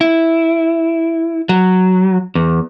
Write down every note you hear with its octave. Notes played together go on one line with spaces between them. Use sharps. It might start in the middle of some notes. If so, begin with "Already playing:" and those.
E4
F#3
E2